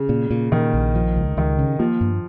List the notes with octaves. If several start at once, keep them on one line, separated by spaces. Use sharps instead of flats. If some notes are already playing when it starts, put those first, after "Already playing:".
Already playing: C#3
A#2
A#2
A#2 D#3
A#1
F3
C#2
C#2 D#3
C#3
F3 A#3
G2